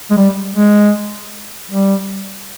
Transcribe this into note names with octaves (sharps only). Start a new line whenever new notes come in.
G#3
G3
G#3
G3